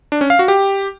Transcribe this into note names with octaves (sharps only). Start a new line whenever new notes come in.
D4
C#4
F5
F#4
G4